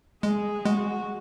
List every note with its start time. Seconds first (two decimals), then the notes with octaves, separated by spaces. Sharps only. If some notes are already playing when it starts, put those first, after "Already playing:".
0.23 G#3 G#4
0.65 G#3 F#4